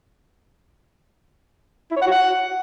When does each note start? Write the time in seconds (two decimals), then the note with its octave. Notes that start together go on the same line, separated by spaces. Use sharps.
1.91 E4
1.96 C#5
2.01 F#5
2.06 F#4
2.12 F#5